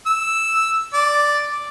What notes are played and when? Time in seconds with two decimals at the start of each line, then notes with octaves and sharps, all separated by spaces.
0.06 E6
0.94 D5